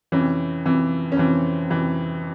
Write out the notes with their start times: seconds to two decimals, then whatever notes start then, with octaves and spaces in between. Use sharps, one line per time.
0.12 F2 C3 E3 C#4
0.65 F2 C3 E3
1.12 C#4
1.17 F2 C3 E3 C4
1.70 F2 C3 E3